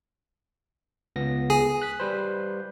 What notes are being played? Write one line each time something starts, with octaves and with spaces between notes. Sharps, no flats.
C#2 B3 A#6
G#4
F#6 B6
G3 B4 C5